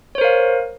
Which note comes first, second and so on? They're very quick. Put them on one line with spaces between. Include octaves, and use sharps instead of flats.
C#5 C5 A#4 F5